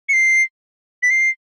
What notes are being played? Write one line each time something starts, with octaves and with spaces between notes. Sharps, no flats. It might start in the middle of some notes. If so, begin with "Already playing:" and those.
C#7
C7
B6
C7